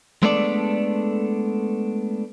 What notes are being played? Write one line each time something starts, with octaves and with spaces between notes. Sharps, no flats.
G#3 A3 B3 D4 A4 D5